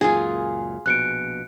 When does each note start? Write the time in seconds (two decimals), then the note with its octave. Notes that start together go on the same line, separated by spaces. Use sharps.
0.01 C#2 F#2 A#2 F4 G#4
0.86 A#1 B2 F#6 C#7 D7